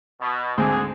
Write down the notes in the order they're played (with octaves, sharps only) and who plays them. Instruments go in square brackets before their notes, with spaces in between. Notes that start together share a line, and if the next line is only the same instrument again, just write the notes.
[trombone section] B2
[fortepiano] D2 G#2 C4 [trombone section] D3 G#4